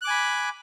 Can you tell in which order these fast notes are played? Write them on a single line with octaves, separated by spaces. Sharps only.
F#6 D6 G#5 B5